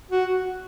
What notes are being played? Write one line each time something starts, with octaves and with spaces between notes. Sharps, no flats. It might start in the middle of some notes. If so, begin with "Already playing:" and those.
F#4